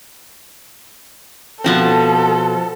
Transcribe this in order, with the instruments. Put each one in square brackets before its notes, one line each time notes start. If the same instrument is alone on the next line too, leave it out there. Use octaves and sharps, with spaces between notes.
[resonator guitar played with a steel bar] B2 F3 C4 [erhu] A4